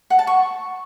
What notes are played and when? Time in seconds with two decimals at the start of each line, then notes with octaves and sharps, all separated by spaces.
0.10 F#5
0.19 A5
0.27 C#6